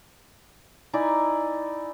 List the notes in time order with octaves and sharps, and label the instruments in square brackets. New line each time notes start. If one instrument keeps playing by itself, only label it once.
[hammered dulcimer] D#4 E4 D5 G#5